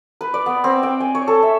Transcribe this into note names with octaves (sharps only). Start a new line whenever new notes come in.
B4
D5
B3
C4
G5
G#5
C#5
A4
E5